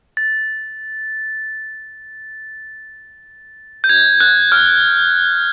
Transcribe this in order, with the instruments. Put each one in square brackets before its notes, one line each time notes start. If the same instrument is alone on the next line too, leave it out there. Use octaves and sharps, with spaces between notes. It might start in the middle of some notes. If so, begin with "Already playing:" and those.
[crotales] A6
G6
G#6
F#6
F6